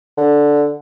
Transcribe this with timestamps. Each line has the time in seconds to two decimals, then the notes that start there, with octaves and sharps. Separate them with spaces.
0.17 D3